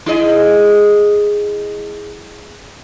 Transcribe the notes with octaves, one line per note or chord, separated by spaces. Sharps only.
E4 G#4 D#5